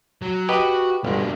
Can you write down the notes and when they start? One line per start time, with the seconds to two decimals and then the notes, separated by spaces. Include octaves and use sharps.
0.22 F#3
0.49 F#4 G4 B4 D#5
1.05 G1 B2 D4